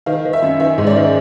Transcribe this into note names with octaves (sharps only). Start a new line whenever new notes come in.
D#3 F5
D#3
E5
F#2
D#3 E5
G#2
D5
D#3